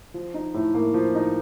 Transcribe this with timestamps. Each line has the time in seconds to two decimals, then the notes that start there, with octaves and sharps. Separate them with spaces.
0.14 F3
0.34 D#4
0.54 A2
0.74 A#3
0.94 F3
1.15 D#4